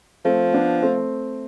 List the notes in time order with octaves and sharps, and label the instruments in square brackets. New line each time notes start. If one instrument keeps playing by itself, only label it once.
[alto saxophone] F3 [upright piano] A3 C4
[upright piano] B3 D4
A3 C4